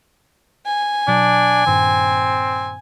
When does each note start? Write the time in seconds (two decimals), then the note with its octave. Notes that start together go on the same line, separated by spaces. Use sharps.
0.66 G#5
1.08 B2 F#3 D4
1.67 G2 A#2 D#3 C4